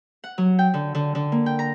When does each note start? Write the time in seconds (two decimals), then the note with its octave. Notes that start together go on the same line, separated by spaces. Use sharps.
0.24 F#5
0.38 F#3
0.59 G5
0.74 D3
0.95 D3
1.15 D3
1.32 A#3
1.46 G5
1.59 A#5